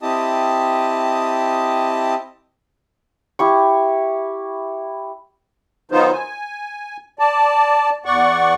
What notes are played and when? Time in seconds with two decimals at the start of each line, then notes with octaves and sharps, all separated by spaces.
0.02 C4 E4 G4 D#5 A5 D#6
3.39 E4 G4 C#6
5.91 D#3 F#3 B3 D#4 F4 C5
6.12 G#5
7.19 D5 A5
8.06 E2 D5 F#5 C#6